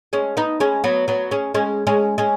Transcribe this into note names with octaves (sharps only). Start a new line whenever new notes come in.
G#3 C#4
B3 D#4
G#3 C#4
F#3 B3
F#3 B3
G#3 C#4
G#3 C#4
G#3 C#4
G#3 C#4